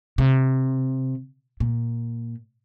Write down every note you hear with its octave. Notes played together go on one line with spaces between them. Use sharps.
C3
A#2